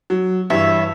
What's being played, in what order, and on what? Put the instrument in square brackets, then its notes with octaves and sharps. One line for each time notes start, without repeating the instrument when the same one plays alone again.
[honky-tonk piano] F#3
[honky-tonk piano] G2 E3 [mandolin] C#5 E5